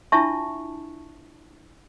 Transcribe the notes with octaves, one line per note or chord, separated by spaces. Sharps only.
D4 E4 F4 E5 A5 C#6